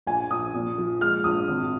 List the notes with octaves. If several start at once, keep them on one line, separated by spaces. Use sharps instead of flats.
A#1 G#5
A#1 D#6
A#2
F3
G#3 F6
A#1 D#6
G#1